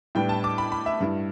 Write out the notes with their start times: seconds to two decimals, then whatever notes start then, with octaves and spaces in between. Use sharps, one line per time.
0.15 A2 G3 B3 D4 G5
0.29 A5
0.44 D6
0.58 B5
0.72 B5
0.86 E5
1.00 G2 G3 E4